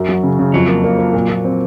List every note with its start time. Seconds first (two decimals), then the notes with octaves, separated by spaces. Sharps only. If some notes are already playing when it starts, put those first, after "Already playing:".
Already playing: F#2
0.09 F#3
0.23 C#3
0.39 C#3
0.54 F2 F#3
0.68 A#3
0.84 A#3
0.99 A#3
1.14 A#2
1.29 A#2
1.45 C4